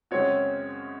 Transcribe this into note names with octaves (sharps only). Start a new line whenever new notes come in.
F#2 C#3 G#3 C4 F#4 C#5